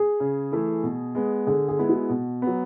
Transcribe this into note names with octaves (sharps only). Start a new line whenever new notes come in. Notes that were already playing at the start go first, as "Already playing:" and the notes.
Already playing: G#4
C#3
E3 A3 E4
B2
G#3 B3
D3 G#4
G#4
G#3 B3 E4
F#4
B2
F#3 B3